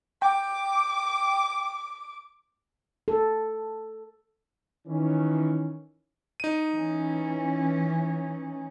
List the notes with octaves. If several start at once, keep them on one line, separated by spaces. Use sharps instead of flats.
G5 D6
A4
D#3 E3 C#4
D#4 D#7
E3 C#4